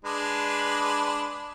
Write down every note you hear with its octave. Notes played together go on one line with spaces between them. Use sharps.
G#3 D4 B4